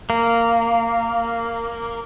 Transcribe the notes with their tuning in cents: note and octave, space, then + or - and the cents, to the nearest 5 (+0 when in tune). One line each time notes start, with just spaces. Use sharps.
A#3 -10